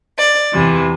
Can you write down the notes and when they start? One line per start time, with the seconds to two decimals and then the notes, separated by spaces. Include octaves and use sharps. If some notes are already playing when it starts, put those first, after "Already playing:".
0.18 D5
0.54 E2 C3 E3